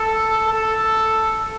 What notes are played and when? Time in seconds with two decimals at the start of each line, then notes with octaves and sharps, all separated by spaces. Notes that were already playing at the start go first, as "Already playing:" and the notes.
Already playing: A4
0.46 A4